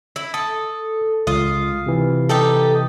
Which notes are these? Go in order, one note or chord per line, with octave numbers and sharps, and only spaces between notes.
E4
A4 D#6
C#2 F4 D#6
C3 E3
D#4 G4 A4